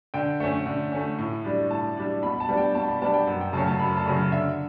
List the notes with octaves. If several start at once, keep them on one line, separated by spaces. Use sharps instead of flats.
D3 G5
A3 C#4
D3
A3 C#4
A2
G3 D4
A2 A5
G3 D4
B2 B5
A5
G3 B3 D4
G5
B2 A5
B5
G3 B3 D4 A5
G5
F#2 F#5
G5
C#3 F#3 A3 C#4 A5
A5
F#2 B5
A5
C#3 F#3 A3 C#4
D3 E5